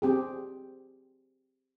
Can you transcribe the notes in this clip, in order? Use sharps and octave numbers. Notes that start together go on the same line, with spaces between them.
C4 G4 G#4